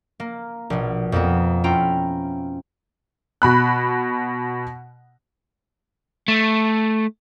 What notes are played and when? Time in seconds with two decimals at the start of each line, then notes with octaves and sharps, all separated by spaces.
0.20 A#3
0.70 A#1 B2
1.12 F2 A#3 B3
1.64 C#4 E4 F4 G5 A#5 B5
3.42 B2 B5 F#6
6.28 A3